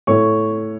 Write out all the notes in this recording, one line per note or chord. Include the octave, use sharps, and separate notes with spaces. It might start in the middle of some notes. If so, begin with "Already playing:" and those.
A2 C#5 C#6